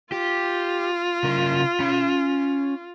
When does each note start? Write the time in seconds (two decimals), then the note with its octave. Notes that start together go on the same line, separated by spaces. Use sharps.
0.12 F4 G4
1.24 C#3 A#4
1.80 C#4 B5